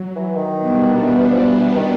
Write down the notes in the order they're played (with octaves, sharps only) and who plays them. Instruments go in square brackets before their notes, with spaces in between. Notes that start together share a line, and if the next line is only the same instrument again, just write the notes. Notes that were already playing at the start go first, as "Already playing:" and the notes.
Already playing: [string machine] F#3
[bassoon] E3
D#3
[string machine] B2 G3 B3 D4
[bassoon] E3
E3
F3
E3
E3
D#3